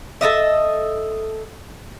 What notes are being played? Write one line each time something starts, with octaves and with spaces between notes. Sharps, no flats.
A4 A#4 D#5 E5